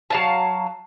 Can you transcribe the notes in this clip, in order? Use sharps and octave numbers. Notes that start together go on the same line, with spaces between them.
F#3 F5 A5